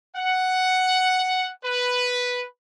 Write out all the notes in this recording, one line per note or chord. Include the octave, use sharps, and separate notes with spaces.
F#5
B4